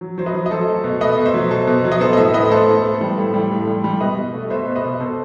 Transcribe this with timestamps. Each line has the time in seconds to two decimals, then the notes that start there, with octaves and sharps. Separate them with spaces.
0.01 F#3
0.18 F#3 C5
0.26 B4 D#5
0.34 F#3
0.46 D#5
0.51 F#3 A4 C5
0.68 A3
0.84 B2
1.01 A3 B4 D#5
1.18 B2
1.26 C5 E5
1.34 F#3
1.51 B2 A4 C5
1.67 B2
1.85 F#3
1.92 D#5
2.00 B3 A4 C5
2.13 D#5
2.17 A2 C5 E5
2.34 A2 B4 D#5
2.50 B3 A4 C5
2.68 A2
2.84 B3
3.01 G3
3.18 A2
3.34 G3
3.51 A2
3.67 G3
3.84 G3
4.01 B2 B4 D#5
4.17 B2
4.34 A3
4.50 B2 C5 E5
4.67 B2
4.76 B4 D#5
4.84 B2
5.00 B2 A4 C5